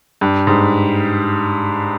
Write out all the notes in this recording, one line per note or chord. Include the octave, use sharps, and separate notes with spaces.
G2
G#2